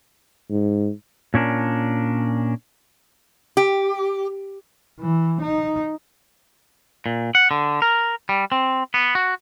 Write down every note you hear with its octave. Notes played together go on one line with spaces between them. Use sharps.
G#2
A#2 C#4 D4 A#4
G4
E3
D#4
A#2
F#5
D3
A#4
G3
C4
B3
F#4